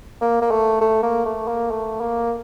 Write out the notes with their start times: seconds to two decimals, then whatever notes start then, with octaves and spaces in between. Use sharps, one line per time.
0.21 A#3
0.41 A#3
0.51 A3
0.81 A3
1.03 A#3
1.25 A3
1.48 A#3
1.71 A3
2.01 A#3